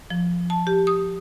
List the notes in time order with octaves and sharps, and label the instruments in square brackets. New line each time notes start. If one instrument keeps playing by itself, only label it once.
[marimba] F3
A5
G4
D#6